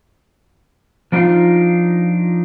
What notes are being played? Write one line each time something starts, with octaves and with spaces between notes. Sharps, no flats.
F3 A#3 D4 D#4 F4 F5